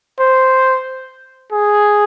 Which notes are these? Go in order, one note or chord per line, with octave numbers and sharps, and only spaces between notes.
C5
G#4